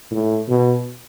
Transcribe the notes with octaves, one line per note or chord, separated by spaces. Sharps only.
A2
B2